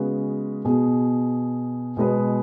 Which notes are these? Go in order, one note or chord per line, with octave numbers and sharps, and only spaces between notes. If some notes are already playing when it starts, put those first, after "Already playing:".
Already playing: C#3 G#3 B3 F#4 B4
B2 B3 G#4
B2 G#3 B3 G#4 B4